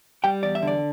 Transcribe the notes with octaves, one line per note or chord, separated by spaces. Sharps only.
G3 G5
E2 D5
E5
D3 D5